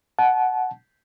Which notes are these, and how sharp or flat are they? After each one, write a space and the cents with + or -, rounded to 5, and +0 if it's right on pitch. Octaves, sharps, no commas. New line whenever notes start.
F#5 +0 A5 -30